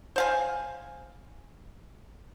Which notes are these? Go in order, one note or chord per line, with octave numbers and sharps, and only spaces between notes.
C5 F5 G#5